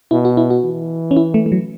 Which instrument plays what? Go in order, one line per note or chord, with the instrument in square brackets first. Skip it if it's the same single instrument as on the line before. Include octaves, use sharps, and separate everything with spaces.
[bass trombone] B2 [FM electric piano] E4
[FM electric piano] F#4
E4
F#4
[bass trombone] E3
[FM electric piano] C#4
E4
A3
A3
F#3